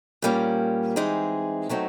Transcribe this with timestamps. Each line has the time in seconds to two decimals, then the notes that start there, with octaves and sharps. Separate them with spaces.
0.22 A#2 G3 A#3 C#4
0.96 E3 G#3 C4 D#4 G#4
1.69 B2 F#3 A3 C4 D#4